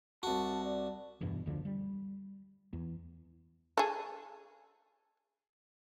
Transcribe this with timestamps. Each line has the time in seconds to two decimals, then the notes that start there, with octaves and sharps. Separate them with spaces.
0.23 C2 F#4 A5
0.64 D5
1.21 F1 E2 G2 B2
1.46 F#1 D2 D3 F3
1.65 G3
2.73 E2
3.78 G#4 A4